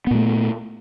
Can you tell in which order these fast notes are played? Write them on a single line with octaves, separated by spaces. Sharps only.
B3 A#2 A3